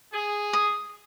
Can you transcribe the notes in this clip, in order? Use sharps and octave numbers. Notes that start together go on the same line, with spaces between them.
G#4
D#6